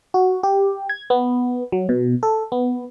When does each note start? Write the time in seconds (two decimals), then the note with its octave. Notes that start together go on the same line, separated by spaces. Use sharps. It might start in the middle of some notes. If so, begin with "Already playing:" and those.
0.14 F#4
0.43 G4
0.89 G#6
1.10 B3
1.72 F#3
1.89 B2
2.23 A4
2.52 B3